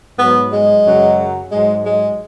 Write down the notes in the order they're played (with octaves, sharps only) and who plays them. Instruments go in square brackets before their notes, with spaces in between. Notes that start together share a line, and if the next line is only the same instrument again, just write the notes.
[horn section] G#2 F#3 B3
G#3
F#2 C#3 F#3
G#2 F#3 G#3
G#3